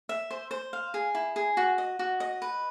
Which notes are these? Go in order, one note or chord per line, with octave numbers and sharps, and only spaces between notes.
E5
C5
C5
F5
G#4
E4
G#4
F#4
D#5
F#4
D#5
B4